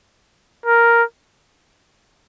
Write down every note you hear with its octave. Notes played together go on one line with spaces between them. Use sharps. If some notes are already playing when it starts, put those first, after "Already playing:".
A#4